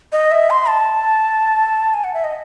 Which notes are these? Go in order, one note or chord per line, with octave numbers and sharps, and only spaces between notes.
D#5
E5
C6
A5
G#5
F#5
E5
D#5